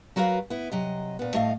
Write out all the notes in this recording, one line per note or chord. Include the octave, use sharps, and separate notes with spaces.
F#3 F#4 A#4 B4 F5
B3 E4
C3 F#3 D#5
A#2 B3
A2 A3 D#5 F5